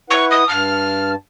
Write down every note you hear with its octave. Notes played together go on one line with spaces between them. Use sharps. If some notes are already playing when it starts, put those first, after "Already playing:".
E4 B4 F#5 C#6
D#6
G2 A5 F6